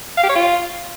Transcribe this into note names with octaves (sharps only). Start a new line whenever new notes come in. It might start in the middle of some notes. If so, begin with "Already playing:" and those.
F5
G4
C#5
F4